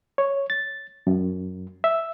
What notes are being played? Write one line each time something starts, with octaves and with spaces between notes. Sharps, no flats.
C#5
A6
F#2
E5